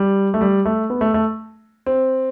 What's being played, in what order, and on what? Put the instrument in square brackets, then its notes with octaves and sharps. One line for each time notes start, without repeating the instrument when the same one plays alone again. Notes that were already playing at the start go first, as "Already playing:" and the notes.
Already playing: [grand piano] G3
A3
G3
A3
B3
A3
A3
C4